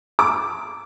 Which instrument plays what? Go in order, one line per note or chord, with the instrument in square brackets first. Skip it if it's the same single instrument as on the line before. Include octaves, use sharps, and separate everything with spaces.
[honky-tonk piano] D6